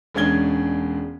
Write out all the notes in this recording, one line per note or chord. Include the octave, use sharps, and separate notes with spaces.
E1 G#3 C#4 D4 G#6 G7